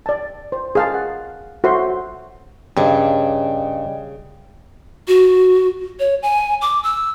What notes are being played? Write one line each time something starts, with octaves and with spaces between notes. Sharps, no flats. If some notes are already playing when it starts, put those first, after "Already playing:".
D5 A5
C5
G#4 F5 A5
F#5
F#4 A4 C5 E5 C6
G2 C#3 G3 G#4 D5 D#5 G5
F#4
C#5
G#5
D6
E6